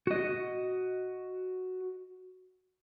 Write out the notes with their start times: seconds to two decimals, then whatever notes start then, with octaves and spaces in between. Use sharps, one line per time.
0.07 F#4 D#5